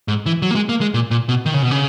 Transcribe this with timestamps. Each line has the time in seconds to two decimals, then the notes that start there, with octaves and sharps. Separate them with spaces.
0.08 G#2
0.26 E3
0.42 F#3
0.51 A#3
0.55 G#3
0.69 A#3
0.81 G#3
0.94 A#2
1.11 A#2
1.29 B2
1.46 D#3
1.54 C#3
1.62 B2
1.71 C#3